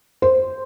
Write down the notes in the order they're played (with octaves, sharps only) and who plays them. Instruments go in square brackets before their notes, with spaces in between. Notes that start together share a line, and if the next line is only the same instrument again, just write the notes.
[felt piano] C5